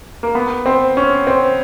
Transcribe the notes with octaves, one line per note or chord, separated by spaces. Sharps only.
A#3
B3
C4
C#4
C4